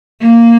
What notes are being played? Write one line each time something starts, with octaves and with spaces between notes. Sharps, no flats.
A#3